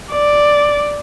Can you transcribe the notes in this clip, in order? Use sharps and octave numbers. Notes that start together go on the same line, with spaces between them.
D5